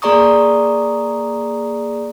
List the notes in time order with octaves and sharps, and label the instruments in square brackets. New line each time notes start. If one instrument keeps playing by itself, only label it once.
[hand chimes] A#3 G#4 D5 A#5 C#6 D#6